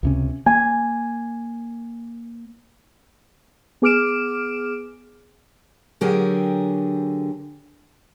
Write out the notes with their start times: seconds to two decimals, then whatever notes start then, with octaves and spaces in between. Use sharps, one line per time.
0.03 C#2 C3 C#4
0.46 A#3 G#5
3.82 B3 G#4 D6 F6 D7 E7
6.01 D3 F#3 G4 G#4 A#4 G5